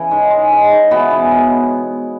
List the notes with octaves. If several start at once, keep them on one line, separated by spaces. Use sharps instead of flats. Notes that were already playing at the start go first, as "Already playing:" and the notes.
Already playing: C#3 E3 E4
G#2
G#3
G#2
G#2
B2 E3 B3
C#3
C#3